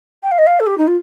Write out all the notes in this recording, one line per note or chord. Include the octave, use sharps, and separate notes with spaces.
G5
F5
D#5
F5
A4
G4
D#4
F4